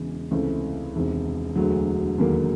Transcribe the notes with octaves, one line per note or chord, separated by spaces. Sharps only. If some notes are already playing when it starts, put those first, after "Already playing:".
Already playing: E1 E2 C#3
C#2 C3 E3 A3 C#4
E1 E2 C3 D#3
E1 D2 D3 F#3
E1 D#2 D3 F#3 A#3